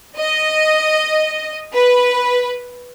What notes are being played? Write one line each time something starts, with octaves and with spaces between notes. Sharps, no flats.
D#5
B4